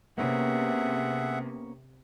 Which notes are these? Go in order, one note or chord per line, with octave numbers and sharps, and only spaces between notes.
C3 A#3 B3 C#4 G#4 E5 F#5